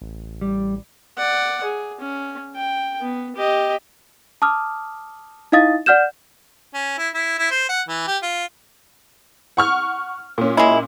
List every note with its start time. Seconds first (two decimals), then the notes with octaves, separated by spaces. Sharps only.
0.02 A1
0.41 G3
1.18 D5 F#5
1.63 G#4
2.00 C#4
2.56 G5
3.01 B3
3.36 G4 D#5
4.42 A5 D6 D#6 F6
5.52 D#4 E4 D#5 F5 D#6 A6
5.86 D5 F#5 F6 G6 E7
6.74 C#4
6.98 E4
7.14 E4
7.39 E4
7.51 C5
7.69 F#5
7.88 E3
8.07 G4
8.23 F4
9.57 F#5 C#6 F6
10.38 A#2 C#4
10.57 G#3 E4